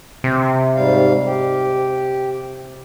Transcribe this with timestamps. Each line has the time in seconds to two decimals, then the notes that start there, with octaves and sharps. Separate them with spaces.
0.24 C3
0.76 G#2 G3 F5
1.25 G4